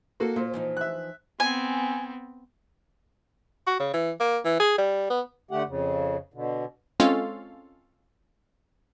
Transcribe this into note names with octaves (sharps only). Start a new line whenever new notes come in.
A#3 F#4 A4
A#2 C5
E3 F3 D#4
E5 F#6
B3 C4 G#5
F#4
C#3
E3
A#3
E3
G#4
G3
B3
D3 A3 G4 F#5
F2 C#3
B2 D3
G#3 C4 C#4 F4 A4 F5